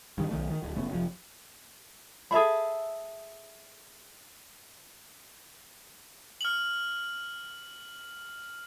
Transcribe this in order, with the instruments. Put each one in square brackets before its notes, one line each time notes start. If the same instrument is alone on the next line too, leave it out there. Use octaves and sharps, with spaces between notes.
[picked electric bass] G2 D#3
B1 D#3 A3
D#3
D1
F#1 A3 B3 C#4
F1 A#2 F3
[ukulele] G#4 A4 E5 B5
[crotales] F6 F#7